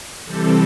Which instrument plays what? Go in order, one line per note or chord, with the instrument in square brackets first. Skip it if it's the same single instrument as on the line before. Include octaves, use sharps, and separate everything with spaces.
[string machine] C3 E3 G3 C4 A4